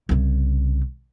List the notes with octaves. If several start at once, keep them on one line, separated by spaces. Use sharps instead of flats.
C2 C#3